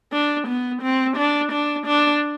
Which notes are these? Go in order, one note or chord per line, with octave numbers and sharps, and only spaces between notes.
D4
B3
C4
D4
D4
D4